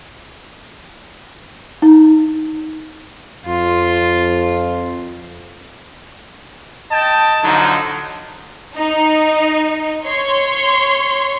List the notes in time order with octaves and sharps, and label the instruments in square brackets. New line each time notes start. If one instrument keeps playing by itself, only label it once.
[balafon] D#4
[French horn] F2 [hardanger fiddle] F4
[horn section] D#5 G5 A5
D3 F3 F#3 D#4
[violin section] D#4
C#5 C6